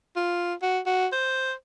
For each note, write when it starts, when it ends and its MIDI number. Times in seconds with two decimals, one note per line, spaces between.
0.16 0.54 65
0.62 0.79 66
0.86 1.07 66
1.13 1.52 72